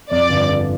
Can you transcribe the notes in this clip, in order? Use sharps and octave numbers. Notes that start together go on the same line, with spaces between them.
F2 D5
G1
D3